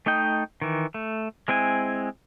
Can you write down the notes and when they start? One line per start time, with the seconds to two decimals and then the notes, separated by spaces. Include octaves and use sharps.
0.06 A3 D#4 D#5 G5
0.62 D#3 E3
0.94 A3
1.48 G#3 C4 E4 G#5